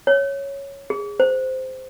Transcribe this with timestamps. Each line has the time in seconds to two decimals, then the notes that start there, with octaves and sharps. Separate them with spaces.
0.07 C#5
0.90 G#4
1.20 C5